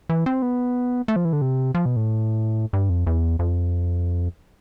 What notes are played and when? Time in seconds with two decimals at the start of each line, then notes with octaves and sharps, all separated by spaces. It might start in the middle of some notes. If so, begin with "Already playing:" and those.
0.09 E3
0.26 C4
0.42 B3
1.08 A3
1.16 F3
1.25 E3
1.33 D3
1.42 C3
1.74 F3
1.86 B2
1.96 A2
2.73 G2
2.90 F2
3.07 E2
3.39 F2